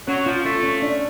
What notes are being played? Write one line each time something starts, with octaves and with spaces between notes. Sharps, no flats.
F#3 C#4
F3 F4
A3 F4
C#4
D4